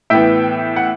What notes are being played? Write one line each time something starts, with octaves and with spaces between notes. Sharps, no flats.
A2 E3 B3 E5 G5
F#5